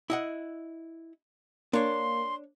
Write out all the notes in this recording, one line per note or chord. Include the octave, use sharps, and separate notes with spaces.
E4 D#5 F#5
A#3 D4 C#5 C6